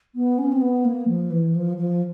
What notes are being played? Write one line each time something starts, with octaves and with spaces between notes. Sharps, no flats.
B3
C#4
C4
B3
A#3
F3
E3
F3
F3